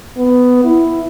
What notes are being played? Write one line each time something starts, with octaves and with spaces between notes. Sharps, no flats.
B3
E4